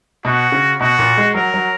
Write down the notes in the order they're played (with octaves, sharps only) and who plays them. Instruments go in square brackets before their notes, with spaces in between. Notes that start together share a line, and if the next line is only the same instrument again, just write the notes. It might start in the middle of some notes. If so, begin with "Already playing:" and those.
[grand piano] B2 [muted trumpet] F#4
[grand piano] C#3
[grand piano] B2 [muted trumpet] F#4
[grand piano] A#2
G#3
[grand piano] F#3 [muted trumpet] A#4
[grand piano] F#3